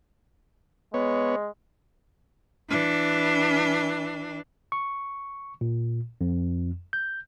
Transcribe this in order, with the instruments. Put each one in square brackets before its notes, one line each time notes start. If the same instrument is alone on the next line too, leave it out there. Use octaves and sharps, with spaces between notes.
[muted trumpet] G#3 [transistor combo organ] B3 C#5
[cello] E3 D4
[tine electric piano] C#6
A#2
F2
G6